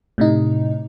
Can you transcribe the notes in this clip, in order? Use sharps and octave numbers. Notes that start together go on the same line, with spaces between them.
A2 C3 D#4